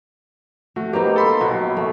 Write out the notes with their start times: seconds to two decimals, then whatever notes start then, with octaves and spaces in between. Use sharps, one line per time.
0.76 A3 F#4
0.93 A#3 B3 D#4 G4 C5
1.16 A4 B5 C6
1.41 B1 F#4
1.77 A3